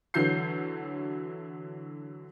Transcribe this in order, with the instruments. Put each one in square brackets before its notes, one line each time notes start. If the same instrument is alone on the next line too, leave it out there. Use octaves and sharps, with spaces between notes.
[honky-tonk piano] D3 E3 F#3 G6 C7